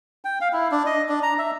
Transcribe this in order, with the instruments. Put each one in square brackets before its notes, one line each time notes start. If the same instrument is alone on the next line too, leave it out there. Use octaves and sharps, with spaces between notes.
[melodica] G5
F5
E4
D4
D#5
D4
A#5
E5